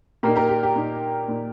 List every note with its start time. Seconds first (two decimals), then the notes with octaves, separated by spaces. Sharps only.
0.23 A#2 A#3 D#4 G4 A#4
0.36 G4 A#4
0.49 G4
0.63 G4
0.76 A#2 A#3 D#4
1.28 A#2 A#3 D#4